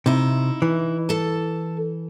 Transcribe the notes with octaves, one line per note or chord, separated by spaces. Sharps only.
C3 D#4 E4
E3
A4 A5